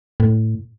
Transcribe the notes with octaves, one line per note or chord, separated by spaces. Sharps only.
A2